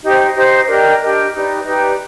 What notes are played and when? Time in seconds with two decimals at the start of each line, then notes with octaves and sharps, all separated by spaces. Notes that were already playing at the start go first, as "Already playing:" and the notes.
0.01 D#4 G4 C5
0.34 D#4 G4 C5
0.67 D4 G4 A#4 D#5
1.00 D4 G4 A#4 D#5
1.32 D#4 G4 B4 D5
1.65 D#4 G4 B4 D5